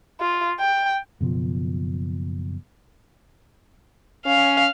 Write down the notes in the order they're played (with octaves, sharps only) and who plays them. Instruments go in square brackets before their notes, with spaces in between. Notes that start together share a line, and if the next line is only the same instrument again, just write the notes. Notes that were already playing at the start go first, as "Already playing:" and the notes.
[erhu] F4
G5
[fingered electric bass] F#1 B2 F3
[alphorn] C#4 [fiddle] F5